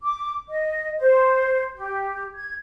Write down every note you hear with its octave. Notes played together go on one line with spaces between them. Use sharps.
D6
D#5
C5
G4
G#6